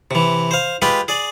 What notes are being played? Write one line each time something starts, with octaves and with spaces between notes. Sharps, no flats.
C3 E3
C5 F5
G#3 F4 G4 B4 G5
G#4 D5